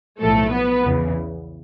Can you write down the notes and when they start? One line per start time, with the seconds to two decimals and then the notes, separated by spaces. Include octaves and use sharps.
0.21 B1 A2 F3 A3 A4
0.52 B3 B4
0.86 E2 C#3 E3